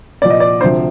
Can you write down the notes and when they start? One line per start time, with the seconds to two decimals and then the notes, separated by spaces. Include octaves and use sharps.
0.21 C2 A#2 F3 D5
0.30 D#5
0.40 D5
0.61 D2 C3 F3 C5